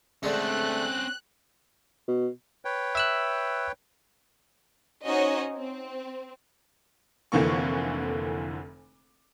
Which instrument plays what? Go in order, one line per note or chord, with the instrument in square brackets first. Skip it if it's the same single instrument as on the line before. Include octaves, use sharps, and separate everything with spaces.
[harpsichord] D3 G#3 [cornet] A3 [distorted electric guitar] C4 C#4 [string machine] F#6
[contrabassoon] B2
[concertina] B4 C#5 G5
[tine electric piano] E5 E6 F#6
[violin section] C#4 D#4 F#4 C5 C#5 D#5
C4
[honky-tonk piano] F1 F2 D3 E3 A#3 C#6